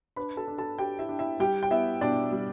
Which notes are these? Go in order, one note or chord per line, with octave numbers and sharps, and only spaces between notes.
D4 B4 B5
A4 A5
D4
A4 A5
D4 G4 G5
E4 E5
D4
E4 E5
G3 G4 G5
G5
B3 E4 E5
B2 D4 D5
G3